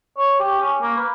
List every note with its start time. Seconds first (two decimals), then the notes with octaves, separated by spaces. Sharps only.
0.17 C#5
0.40 G4
0.60 C#4
0.82 A#3
0.97 B4